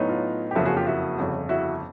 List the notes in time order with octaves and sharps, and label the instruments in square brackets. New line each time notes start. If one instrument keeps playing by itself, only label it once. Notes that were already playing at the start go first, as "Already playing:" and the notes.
Already playing: [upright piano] A2 F#3 B3 D#4
F4
G4
F#1 F2 C#3 F3 A#3 E4 F#4
F#4 G#4
F4 G4
E4 F#4
G1 F2 C#3
E4 F#4